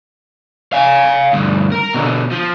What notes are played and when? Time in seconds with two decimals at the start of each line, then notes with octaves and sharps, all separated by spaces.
0.73 F5 G#5
1.33 D2 G2
1.72 A#4
1.94 B2 D3
2.32 F3